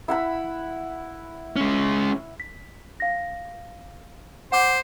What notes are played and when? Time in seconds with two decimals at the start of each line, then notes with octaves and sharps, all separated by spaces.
0.08 E4 F#5 B5
1.56 G#3 C#4
2.40 B6
3.00 F5 A#6
4.52 C5 F#5 D6 G6